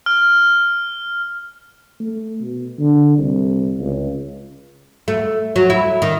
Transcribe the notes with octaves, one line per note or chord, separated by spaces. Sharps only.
F6
A3
B2
D3
C2
C#2
A3
F#3
E4
D#3